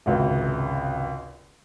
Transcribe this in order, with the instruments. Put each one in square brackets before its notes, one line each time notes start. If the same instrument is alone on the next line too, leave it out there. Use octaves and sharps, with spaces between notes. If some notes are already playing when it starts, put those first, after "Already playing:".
[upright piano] G#1 C#2 C3